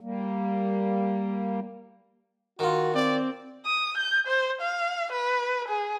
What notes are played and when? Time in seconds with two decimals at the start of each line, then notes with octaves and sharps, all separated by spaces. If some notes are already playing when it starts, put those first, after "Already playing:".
0.01 G3 A#3
2.59 D#3 F4 F#4
2.95 C4 D5
3.66 D#6
3.97 G6
4.27 C5
4.61 F5
5.12 B4
5.68 G#4